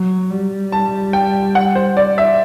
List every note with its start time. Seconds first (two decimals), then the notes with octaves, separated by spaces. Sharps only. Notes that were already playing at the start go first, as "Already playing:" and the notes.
Already playing: F#3
0.30 G3
0.72 A5
1.13 G5
1.55 F#5
1.75 C5
1.97 D5
2.18 E5